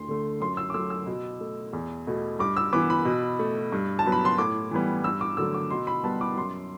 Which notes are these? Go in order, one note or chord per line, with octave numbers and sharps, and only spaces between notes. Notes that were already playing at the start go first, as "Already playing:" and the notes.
Already playing: D2 C6
D3 A3
F#2 C6
E6
D6
F#3 A3 E6
E6
B2
A3
E2
B2 A3
G2 D6
E6
E3 B3 D6
B5
B2
A3
G2
A5
F#3 B3
B5
C6
A2 D6
E3 G3 B3
G2 E6
D6
D3 F#3 A3 E6
D6
B2 C6
B5
G3 B3 A5
D6
F#2 C6